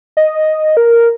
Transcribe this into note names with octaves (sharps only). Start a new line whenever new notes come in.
D#5
A#4